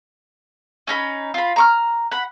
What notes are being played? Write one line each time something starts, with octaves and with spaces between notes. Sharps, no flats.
C#4 D#4 B5
F4 B5
A#5 C#6 F6
F#5 B5